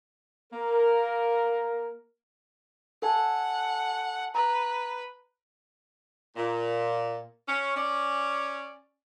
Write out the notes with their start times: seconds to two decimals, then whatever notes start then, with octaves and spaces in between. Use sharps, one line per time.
0.52 A#3 A#4
3.02 A4 F#5 G#5 A5
4.35 B4 A#5
6.36 A#2
7.47 C#4
7.76 C#4 D5